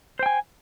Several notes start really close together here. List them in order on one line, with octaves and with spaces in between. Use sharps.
C5 G5 G#5